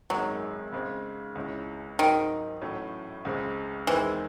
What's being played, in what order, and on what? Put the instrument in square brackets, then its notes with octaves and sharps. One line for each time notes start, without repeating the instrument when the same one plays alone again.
[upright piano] G#1 F#2 D#3 G#3 [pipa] F#3
[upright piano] C#3 G#3 C4
C#2 C#3 G#3 C#4 E4
[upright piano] G#2 F#3 C4 D#4 [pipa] D#3
[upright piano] A1 A2 F#3 A3 C#4
C#2 C#3 G#3 C4
[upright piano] E2 D#3 G#3 C4 [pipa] E3